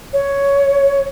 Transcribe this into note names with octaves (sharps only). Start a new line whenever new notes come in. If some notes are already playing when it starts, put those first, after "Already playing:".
C#5